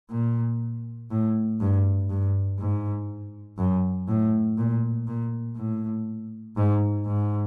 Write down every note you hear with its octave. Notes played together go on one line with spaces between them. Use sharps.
A#2
A2
G2
G2
G#2
F#2
A2
A#2
A#2
A2
G#2
G#2